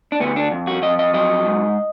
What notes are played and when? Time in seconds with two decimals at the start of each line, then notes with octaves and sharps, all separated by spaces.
0.12 D4
0.20 D2 B3
0.36 D4
0.52 F2
0.67 F#4
0.82 F2 D#5
0.99 D#5
1.14 F#3 D#5
1.46 G#2